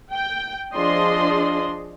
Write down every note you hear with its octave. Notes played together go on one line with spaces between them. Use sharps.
G5
F3 D4 G#4 D#5 C6